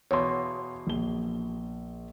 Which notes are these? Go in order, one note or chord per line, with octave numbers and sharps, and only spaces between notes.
E2 B2 C#5 F5 C6
A#1 G7